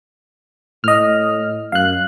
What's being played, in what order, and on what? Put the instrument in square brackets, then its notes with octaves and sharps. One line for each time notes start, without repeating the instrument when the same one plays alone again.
[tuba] A2 [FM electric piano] D#5 F6
[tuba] F#2 [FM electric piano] F5 F#6